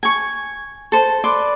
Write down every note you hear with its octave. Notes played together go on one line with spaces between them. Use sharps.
G#5 C#6
A4 C5
B4 D5 C6